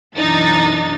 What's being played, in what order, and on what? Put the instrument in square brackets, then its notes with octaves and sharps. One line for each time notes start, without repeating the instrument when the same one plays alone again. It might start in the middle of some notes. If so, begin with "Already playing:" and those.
[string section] B1 F#2 E3 D4 D#4 A6